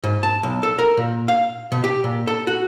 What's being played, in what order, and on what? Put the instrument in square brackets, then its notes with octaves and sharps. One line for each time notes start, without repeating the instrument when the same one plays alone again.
[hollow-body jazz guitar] G#2
A5
B1
A4
A#4
A#2
F5
B2
G4
A#2
A4
F#4